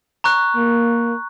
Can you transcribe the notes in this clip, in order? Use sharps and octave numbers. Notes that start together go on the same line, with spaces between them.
A#5 C#6 F#6
A#3